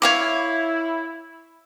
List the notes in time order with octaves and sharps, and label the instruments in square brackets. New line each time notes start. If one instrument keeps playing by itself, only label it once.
[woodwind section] E4 [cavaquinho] C#5 F5 D6